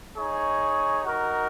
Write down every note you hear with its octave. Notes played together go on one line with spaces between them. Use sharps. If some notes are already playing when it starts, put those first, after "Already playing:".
D#4 G#4 C#5
D#4 F#4 A#4